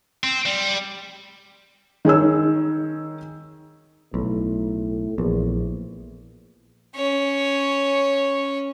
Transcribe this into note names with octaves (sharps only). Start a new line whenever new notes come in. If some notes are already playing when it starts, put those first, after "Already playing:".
C4
G3
D#3 G#4 C#5 E6
B1 A2
A#1 E2
C#4 C#5